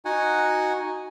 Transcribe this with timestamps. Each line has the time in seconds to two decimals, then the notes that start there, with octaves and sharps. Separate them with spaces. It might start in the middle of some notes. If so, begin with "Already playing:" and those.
0.05 D#4 F#4 F#5 G#5